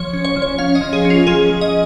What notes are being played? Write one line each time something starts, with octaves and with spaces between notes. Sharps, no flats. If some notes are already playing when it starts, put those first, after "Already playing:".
Already playing: F3 C#5
C#4
C#5
F3
C#5
C#4 F5
D#5
F3
G#4
C#4
F4
F3 G#4
F3
D#5